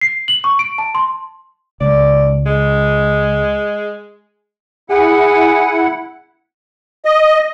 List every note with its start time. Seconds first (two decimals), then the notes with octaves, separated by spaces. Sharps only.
0.01 C7
0.28 F#7
0.44 C#6
0.59 D7
0.78 A5
0.95 C6
1.81 C#2 D5
2.46 G#3
4.90 E4 G#4 F#5
7.05 D#5